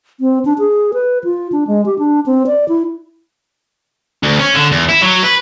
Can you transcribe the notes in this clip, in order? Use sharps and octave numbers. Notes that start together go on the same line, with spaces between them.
C4
D4
G#4
B4
F4
D4
G#3
G4
D4
C4
D5
E4
D2
C#4
D3
E2
E4
F#3
B4